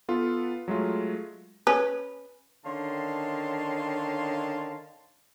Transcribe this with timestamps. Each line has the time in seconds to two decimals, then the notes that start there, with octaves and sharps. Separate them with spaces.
0.08 B3 F4 A4 B4
0.68 F#3 G#3 A3 F4
1.67 C#4 B4
2.66 D3 D#3 C#4 F5 A5 C6